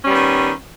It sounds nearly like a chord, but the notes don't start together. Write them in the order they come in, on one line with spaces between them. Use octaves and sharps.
C#4 G3 B3 D#3